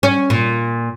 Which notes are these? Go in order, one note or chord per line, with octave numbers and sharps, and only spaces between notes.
C#4
A#2